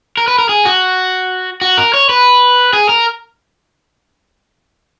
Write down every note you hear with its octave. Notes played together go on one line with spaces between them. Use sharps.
A#4
B4
A#4
G#4
F#4
F#4
A#4
C#5
B4
G#4
A#4